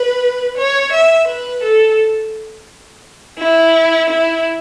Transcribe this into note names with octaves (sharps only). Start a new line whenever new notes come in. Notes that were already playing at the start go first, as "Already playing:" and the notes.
Already playing: B4
C#5
E5
B4
A4
E4
E4